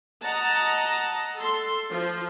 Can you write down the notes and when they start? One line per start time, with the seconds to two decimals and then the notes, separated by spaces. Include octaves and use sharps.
0.22 D#5 F#5 A5 A#5
1.37 A4 C6
1.91 F3